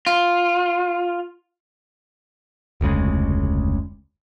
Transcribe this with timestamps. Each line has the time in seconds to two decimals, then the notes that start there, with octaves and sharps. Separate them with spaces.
0.07 F4
2.81 F1 D2 C#3 G#3